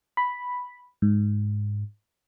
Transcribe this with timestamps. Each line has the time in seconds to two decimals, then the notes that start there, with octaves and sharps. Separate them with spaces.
0.17 B5
1.02 G#2